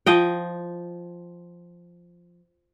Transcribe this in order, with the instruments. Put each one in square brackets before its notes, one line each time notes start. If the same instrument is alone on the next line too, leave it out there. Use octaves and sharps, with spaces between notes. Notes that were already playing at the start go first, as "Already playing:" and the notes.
[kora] F3 D#5 G5